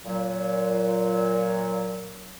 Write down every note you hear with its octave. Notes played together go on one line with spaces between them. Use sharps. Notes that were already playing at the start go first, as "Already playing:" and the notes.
A#2 F#3